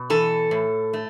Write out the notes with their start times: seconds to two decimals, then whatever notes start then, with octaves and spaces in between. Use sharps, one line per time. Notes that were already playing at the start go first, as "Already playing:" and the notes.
Already playing: B2
0.10 E3 A4
0.51 A2
0.93 A3